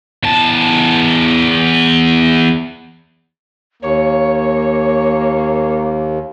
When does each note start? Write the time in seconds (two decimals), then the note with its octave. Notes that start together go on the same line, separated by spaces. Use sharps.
0.23 E2 A5
3.82 D#2 A#3 C#5